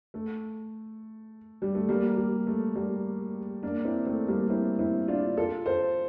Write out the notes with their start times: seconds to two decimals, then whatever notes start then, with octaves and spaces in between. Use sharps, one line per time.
0.14 A3
1.62 G3
1.75 A3
1.89 G3 A#3
2.17 G3
2.47 A3
2.75 G3 A#3
3.63 A#3 D4
3.85 C4 E4
4.06 A3 C4
4.28 G3 A#3
4.50 C4 E4
4.79 C4 E4
5.08 D4 F4
5.37 F4 A4
5.66 A4 C5